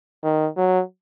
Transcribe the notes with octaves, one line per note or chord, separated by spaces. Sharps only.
D#3
F#3